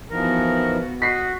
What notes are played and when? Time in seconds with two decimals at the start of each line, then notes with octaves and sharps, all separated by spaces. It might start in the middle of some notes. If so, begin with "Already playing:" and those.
0.11 E3 F3 B3 D#4 F#4 A#4
1.02 F#4 D#5 B6 C7